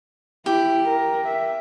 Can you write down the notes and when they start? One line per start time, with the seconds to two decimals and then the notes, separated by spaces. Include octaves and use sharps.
0.46 E4 G4
0.89 A#4
1.28 E5